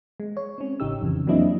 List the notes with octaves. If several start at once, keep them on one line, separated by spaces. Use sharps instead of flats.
G#3
C#5
C4 C#4
A1 C#3 D#4 G4 E6
F2 C#3 E3
F#3 A#3 C4 D4 E4 D#5